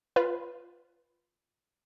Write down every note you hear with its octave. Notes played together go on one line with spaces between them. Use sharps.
F4 B4